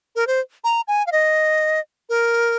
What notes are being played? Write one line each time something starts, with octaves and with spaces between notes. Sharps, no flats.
A#4
C5
A#5
G#5
F5
D#5
A#4